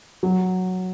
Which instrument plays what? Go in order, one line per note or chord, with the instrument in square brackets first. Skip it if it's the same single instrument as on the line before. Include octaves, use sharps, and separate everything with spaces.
[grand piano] F#3